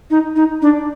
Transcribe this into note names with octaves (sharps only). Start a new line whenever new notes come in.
D#4
D#4
D4